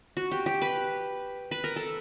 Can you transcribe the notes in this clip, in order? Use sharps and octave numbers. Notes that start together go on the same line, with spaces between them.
F#4
G4
G4
B4
B4
A#4
A4